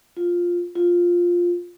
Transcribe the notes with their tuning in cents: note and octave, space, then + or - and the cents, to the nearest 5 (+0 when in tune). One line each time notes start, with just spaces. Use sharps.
F4 +5
F4 +5